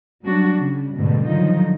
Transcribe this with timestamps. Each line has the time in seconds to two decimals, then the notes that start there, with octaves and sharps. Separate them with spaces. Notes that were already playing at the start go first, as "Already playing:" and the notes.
0.24 F#3 G3 D4 F#4
0.58 C#3 G3
0.97 D2 G#2 B2 D3 G3
1.28 G2 D3 D#3 F3 F#3 D#4